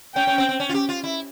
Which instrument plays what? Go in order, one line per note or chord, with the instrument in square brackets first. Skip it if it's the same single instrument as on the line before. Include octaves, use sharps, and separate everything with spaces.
[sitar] C#4 [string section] G5
[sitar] C#4
C4
C4
C#4
F4
G4
F4
E4